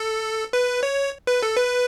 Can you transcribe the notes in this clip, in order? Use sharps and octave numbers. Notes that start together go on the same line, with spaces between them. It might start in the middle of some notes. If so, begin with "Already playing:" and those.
Already playing: A4
B4
C#5
B4
A4
B4